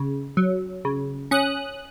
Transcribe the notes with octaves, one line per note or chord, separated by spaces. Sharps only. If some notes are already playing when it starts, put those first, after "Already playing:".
Already playing: C#3
F#3
C#3
C#4 D#6 F#6